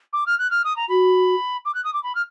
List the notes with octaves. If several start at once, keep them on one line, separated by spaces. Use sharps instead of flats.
D6
F6
F#6
F6
D#6
A#5
F#4 B5
D6
F#6
D#6
D6
B5
F6